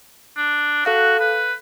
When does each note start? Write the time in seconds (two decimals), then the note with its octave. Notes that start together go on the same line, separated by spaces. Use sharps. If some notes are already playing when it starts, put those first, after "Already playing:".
0.37 D4
0.85 F#4 A4 F5 F#6
1.19 B4